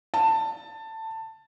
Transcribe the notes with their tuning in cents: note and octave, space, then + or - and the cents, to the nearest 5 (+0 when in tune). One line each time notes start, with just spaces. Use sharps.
A5 +15